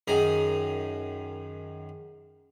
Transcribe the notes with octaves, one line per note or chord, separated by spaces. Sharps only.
F#2 D#3 G#4 A#5